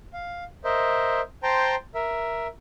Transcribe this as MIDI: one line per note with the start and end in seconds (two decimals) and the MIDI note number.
0.14 0.44 77
0.64 1.21 70
0.64 1.21 72
0.64 1.21 75
0.64 1.21 76
1.43 1.75 72
1.43 1.75 79
1.43 1.75 81
1.43 1.75 82
1.43 1.75 84
1.95 2.47 70
1.95 2.47 76